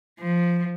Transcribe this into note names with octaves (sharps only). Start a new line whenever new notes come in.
F3